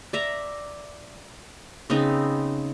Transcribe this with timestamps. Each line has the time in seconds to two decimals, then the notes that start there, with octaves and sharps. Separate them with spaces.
0.13 D5 E5 A#5
1.90 C#3 B3 C4 D#4